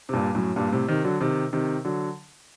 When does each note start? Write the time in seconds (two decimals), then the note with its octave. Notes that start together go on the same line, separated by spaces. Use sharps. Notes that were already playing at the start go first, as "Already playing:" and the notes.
0.09 C3
0.13 G2 A#2
0.35 F#2 A2
0.56 G2 A#2
0.72 A2 C3
0.88 C3 D#3
1.04 D3 F#3
1.21 C3 D#3
1.53 C3 D#3
1.85 D3 F#3